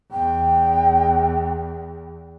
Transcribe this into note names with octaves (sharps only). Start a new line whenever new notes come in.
E2 G5